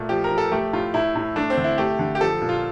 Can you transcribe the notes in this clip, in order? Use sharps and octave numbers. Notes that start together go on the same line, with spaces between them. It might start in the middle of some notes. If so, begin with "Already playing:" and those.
Already playing: A#2 A3
F3 G4
A#4
F3
A4
A3 G4
A2 F4
A2 E4
A2
A3 D4
C4
D3
E4
A3 G4
D3
G4
F3 A4
A#2
F4